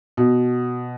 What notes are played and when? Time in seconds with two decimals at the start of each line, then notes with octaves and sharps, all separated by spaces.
0.17 B2